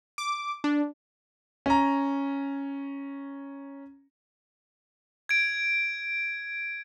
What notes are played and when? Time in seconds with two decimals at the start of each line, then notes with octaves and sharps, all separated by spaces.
0.18 D6
0.64 D4
1.66 C#4 A#5
5.29 G#6 D7